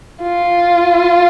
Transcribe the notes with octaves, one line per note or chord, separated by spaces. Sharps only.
F4